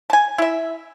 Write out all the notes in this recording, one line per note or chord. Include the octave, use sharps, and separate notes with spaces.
G#5 A5
E4 E5